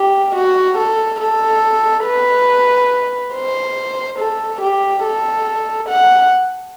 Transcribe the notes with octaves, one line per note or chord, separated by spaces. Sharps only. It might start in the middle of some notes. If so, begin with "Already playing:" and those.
Already playing: G4
F#4
A4
A4
B4
C5
A4
G4
A4
F#5